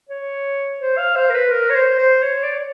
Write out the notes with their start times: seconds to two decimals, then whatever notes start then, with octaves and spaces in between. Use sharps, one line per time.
0.09 C#5
0.80 C5
0.98 F5
1.16 C5
1.30 A#4
1.34 B4
1.51 A#4
1.70 C#5
1.75 C5
1.98 C5
2.23 C#5
2.43 D5
2.51 C#5